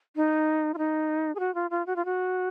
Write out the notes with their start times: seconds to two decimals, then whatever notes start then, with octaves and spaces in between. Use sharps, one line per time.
0.16 D#4
0.74 F4
0.78 D#4
1.35 G#4
1.39 F#4
1.55 F4
1.70 F4
1.86 F#4
1.96 F4
2.05 F#4